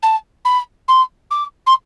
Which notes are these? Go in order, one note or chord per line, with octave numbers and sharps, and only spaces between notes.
A5
B5
C6
D6
C6